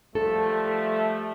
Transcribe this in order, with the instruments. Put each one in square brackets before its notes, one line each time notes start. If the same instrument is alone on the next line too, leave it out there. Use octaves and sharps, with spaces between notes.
[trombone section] F3 G3 A3 [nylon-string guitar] A4